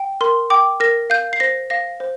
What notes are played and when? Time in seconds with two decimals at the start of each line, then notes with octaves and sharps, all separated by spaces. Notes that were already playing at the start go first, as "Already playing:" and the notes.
Already playing: G5
0.21 A#4 C6
0.50 G5 D6
0.80 A#4 A#6
1.10 F5 G6
1.33 C7
1.40 C5 A#6
1.70 F5 A#6
2.00 C5